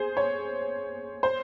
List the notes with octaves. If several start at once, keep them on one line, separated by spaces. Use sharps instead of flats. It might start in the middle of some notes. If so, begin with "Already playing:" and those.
Already playing: G#4 C5
C#5
C5